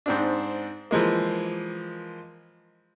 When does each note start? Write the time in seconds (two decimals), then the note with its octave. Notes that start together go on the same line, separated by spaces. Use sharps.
0.06 G#2 C4 D4
0.91 E3 F3 G#3 A#3